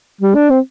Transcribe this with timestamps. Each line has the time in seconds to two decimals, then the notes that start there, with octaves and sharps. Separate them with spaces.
0.21 G3
0.35 D4
0.50 C4